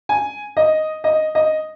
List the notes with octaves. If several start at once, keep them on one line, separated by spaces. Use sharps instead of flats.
G#5
D#5
D#5
D#5